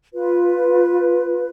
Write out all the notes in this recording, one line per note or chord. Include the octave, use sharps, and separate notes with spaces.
F4 B4